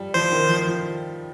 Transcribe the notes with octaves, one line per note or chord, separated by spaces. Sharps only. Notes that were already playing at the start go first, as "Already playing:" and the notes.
Already playing: F3 G3
F3 C5
D#3
F3
F3